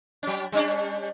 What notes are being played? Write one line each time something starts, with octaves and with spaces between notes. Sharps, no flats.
F#3 C#4
G3 C#4 D4